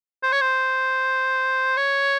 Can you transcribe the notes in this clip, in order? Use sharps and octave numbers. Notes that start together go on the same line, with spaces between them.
C5
C#5
C5
C#5